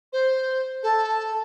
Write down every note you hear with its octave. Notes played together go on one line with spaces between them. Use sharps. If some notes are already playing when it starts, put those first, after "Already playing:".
C5
A4